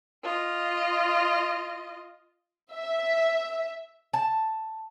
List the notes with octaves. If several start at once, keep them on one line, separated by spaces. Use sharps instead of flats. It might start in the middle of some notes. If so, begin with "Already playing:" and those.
F4 D#5
E5
A5